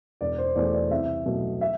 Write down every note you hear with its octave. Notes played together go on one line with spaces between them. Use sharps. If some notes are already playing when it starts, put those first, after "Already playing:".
E1 D5
C5
E2 B2 A3 D5
D5
C2 E5
B2 F#3 A3
E5